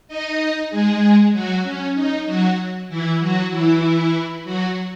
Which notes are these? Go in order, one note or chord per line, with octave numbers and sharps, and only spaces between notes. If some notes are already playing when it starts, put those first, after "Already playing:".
D#4 D#5
G#3 G#4
F#3 F#4
C#4
D#4
F#3 F#4
E3 E4
F#3 F#4
E3 E4
F#3 F#4